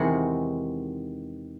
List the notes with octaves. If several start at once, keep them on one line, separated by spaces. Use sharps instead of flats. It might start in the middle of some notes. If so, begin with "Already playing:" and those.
Already playing: E2 C3 D#3 G#3 F#4